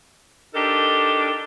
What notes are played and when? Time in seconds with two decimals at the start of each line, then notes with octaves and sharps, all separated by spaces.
0.55 D4 D#4 G4 A4 A#4